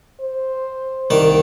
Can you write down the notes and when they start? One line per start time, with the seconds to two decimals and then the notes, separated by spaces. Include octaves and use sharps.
0.21 C5
1.10 C2 D#3 D5